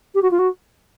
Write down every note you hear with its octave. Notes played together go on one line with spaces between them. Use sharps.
G4
F#4
F4
F#4